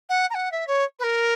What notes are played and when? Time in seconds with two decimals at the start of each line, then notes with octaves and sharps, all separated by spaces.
0.09 F#5
0.30 A#5
0.34 F#5
0.52 E5
0.67 C#5
0.99 B4
1.03 A#4